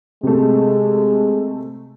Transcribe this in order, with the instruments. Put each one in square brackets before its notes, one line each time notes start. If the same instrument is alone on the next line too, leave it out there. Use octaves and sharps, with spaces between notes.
[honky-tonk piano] C3 A3 [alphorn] G#3